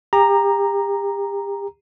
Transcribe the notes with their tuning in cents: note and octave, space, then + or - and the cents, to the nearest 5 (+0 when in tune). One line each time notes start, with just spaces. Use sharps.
G4 +35 A#5 +0